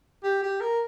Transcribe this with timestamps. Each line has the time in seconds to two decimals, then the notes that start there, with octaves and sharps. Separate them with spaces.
0.24 G4
0.43 G4
0.61 A#4